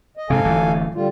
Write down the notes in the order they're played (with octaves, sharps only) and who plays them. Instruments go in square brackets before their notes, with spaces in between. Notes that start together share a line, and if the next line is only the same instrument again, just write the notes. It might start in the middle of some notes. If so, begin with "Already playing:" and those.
[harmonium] D#5
[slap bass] G#2 C3 [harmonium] A4 F5 G#5
[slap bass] D1 E3 A3
[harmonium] D3 G3 F4